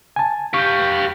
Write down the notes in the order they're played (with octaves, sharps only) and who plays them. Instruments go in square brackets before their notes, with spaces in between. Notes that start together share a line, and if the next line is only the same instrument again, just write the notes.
[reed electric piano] G#5 A5
[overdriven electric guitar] G4 F5 [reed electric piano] C#6 G6